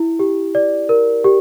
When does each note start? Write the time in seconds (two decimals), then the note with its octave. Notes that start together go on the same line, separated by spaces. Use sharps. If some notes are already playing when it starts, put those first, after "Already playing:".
Already playing: E4
0.19 G4
0.55 D5
0.89 A#4
1.24 G4